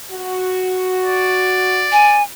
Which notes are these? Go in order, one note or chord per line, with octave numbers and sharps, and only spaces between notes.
F#4
D5
G#5